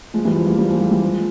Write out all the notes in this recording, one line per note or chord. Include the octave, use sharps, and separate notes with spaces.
F3 G#3
E3 G3
F3 G#3
G3 A#3
G3 A#3
F3 G#3
G3 A#3
E3 G3
F3 G#3